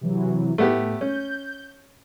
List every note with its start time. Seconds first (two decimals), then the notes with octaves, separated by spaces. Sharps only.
0.01 C3 E3 F#3
0.58 A2 A3 B3 G4
1.01 C#4 G6